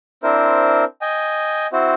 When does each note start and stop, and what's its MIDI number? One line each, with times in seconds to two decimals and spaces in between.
0.23 0.84 60
0.23 0.84 62
0.23 0.84 64
0.23 0.84 70
0.23 0.84 72
1.02 1.67 75
1.02 1.67 79
1.02 1.67 80
1.73 1.94 60
1.73 1.94 64
1.73 1.94 66
1.73 1.94 72